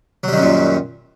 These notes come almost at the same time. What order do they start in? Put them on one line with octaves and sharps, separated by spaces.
F#3 G3 D#3 F#2 A#2